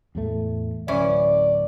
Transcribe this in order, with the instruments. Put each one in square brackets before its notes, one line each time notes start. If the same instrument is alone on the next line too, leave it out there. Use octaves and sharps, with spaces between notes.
[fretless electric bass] E2 A2 A3
[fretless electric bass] D1 [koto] E3 C#4 [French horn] D5